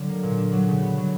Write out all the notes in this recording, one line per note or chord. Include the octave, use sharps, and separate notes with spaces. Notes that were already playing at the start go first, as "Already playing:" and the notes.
Already playing: D3 F#3
A#3
A#2
D4
F#3
C#3
B3
F#3